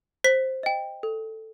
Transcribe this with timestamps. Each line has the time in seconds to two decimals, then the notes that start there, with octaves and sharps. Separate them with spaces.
0.24 C5 B6
0.63 D#5 G5
1.03 A4